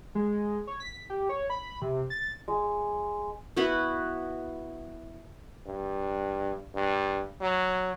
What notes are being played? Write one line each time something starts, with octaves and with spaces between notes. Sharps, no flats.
G#3
C#5
B6
G4
C#5
B5
C3
A6
G#3
B3 E4 F#4 B4
G2
G2
F#3